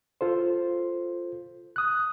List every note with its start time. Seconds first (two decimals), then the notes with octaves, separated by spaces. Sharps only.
0.21 F4 A4 C5
1.76 D#6 F#6